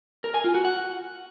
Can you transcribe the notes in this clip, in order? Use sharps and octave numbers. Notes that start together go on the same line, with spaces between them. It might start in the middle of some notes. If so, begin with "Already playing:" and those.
A#4
G#5
F4
F#4
F#5